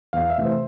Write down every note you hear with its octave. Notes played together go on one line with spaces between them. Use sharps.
E2 F5
E5
C3 E3 A3
C5